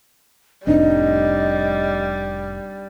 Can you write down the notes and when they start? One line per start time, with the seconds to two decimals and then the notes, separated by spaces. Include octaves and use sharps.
0.67 F1 A2 G3 C4 D4 D#4 D#5